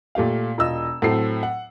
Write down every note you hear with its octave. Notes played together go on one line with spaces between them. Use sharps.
A#2 A3 G4 F5
E1 F4 D#5 E6
A2 F#3 A3 C4 A4 C7
F#5